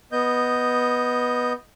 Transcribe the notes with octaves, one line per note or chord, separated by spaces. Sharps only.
B3 D#5 G6